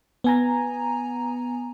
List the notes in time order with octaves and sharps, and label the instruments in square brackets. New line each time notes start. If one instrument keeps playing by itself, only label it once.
[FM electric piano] B3 G#5 A#5